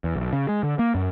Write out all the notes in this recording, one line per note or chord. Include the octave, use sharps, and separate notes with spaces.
E2
B1
C#3
G#3
D3
A#3
F#2